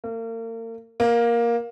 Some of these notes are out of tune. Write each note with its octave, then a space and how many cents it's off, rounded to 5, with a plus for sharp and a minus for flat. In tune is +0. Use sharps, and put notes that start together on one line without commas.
A#3 -40
A#3 +10